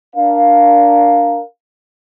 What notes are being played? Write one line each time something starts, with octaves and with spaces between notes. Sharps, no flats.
D4 A#4 F5